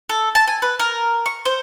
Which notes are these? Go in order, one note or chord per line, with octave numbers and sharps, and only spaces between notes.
A4
A5
G#5
B4
A#4
C#6
C5